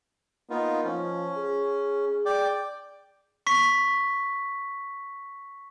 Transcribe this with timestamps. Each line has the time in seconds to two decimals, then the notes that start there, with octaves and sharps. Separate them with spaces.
0.50 A#3 B3 D#4 F4
0.84 F3 C#4
1.37 G#4
2.26 D5 G5 D6
3.47 C#6 B6